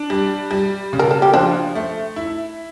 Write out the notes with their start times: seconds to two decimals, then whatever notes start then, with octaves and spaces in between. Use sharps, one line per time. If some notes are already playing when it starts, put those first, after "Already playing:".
Already playing: D4
0.10 G3
0.51 G3
0.93 C#3
0.99 A#4
1.11 A4
1.22 G4
1.34 F3 D4 F4
1.75 A3
2.16 E4